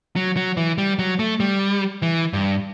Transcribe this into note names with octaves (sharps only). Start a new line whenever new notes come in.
F#3
F#3
E3
G3
F#3
A3
G3
E3
G2